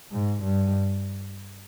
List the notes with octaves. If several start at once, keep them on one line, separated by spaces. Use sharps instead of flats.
G#2
G2